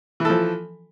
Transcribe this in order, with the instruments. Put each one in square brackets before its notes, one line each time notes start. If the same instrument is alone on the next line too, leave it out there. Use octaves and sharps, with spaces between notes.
[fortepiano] E3
A4
F3